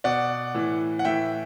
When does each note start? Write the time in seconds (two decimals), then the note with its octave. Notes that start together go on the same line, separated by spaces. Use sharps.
0.04 B2 D5 F#5
0.55 A2 E3
0.99 F#5
1.05 A2 E3 E5 G5